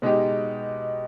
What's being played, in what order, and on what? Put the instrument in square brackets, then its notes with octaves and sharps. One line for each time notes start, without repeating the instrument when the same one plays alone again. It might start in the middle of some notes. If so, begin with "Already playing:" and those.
[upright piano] B2 G#3 D#4 G4